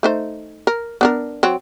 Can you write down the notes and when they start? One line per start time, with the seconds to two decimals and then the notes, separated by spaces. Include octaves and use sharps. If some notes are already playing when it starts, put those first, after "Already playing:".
0.03 A3 D#4 C5
0.67 A#4
1.01 B3 D4 A#4
1.43 F#3 C4